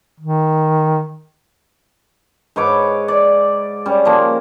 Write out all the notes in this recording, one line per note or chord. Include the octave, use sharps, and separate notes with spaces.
D#3
G#2 B4 C#5 D6
D5
G3 C#4
F3 A#3